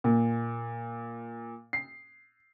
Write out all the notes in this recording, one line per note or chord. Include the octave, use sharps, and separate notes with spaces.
A#2
C7